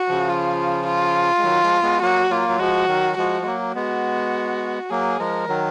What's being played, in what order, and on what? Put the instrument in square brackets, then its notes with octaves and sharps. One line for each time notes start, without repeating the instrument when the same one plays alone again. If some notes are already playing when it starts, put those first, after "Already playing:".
Already playing: [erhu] F#4
[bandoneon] C#3 F3
[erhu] F4
F4
[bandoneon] G#3
D#3 F#3
F3 G#3
G#3 B3
[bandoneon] F#3 A#3 [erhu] F#4
[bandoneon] F#3 A#3 [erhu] F4
[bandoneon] F#3
[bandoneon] F3 G#3 [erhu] F#4
[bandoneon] D#3 F#3
[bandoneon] F3 G#3 [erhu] F#4
[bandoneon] G#3
F#3 A#3
[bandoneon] G#3 B3 [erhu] F#4
[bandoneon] F#3 A#3 [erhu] G#4
[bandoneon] F3 G#3 [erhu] A#4
[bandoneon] D#3 F#3